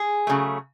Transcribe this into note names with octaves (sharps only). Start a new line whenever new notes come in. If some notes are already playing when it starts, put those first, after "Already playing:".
Already playing: G#4
C#3 F#3 A3